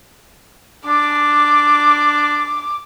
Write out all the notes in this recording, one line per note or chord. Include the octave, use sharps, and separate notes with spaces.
D4 D6